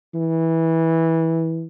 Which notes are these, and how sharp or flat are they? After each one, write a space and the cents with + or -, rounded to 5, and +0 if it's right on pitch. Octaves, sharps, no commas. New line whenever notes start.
E3 -15